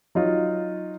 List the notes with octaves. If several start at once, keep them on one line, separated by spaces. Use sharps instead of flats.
F#3 D#4 F4